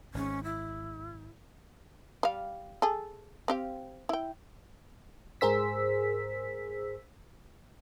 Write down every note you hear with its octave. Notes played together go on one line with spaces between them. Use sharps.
G#1 G#2 C#4
E4
G3 F5
G#4 A4
C4 G4 F5
E4 G5
G#2 G#4 A#4 C5 E6 B6